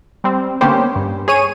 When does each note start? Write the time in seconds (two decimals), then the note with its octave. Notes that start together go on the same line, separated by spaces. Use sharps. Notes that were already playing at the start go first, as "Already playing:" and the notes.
0.24 G3 C4
0.61 D3 A#3 B3 C#4 G4 C5
0.96 G2
1.28 G#4 C#5 D#7